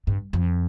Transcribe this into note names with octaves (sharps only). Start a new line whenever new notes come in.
G2
F2